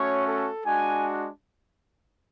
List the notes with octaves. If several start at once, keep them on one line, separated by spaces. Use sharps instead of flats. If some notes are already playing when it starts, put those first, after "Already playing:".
Already playing: A3 C#4 F#4 C#5
A4
G#3 D4 F#4 G#5